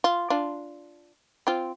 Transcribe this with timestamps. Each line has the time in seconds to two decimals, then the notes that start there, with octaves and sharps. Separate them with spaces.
0.04 F4
0.30 D4 F4
1.47 C4 F4